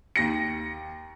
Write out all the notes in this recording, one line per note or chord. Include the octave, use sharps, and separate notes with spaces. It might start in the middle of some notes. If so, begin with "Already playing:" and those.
D#2 A#6 C#7